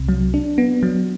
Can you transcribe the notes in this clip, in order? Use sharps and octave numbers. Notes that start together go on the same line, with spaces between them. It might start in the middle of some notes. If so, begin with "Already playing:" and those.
Already playing: C2 C3
F#3
D4
B3
F#3